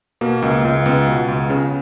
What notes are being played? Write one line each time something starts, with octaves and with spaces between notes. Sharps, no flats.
B2 A#3
C#2
C#2
C#2 B3
B2
C#2
C#3